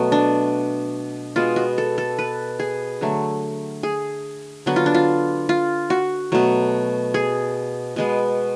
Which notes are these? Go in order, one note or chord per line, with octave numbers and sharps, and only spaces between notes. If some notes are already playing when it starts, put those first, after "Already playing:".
Already playing: B2 F#3 A3
D4
B2 G#3 B3 F4
F#4
A4
A4
B4
G#4
D3 F#3 A3
G#4
D3 F#3 B3 F#4
F4
D4
F4
F4
F#4
B2 F#3 A3
G#4
B2 G#3 B3